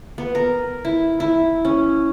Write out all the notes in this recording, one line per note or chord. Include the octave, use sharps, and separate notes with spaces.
B3
A#4
E4
E4
C#4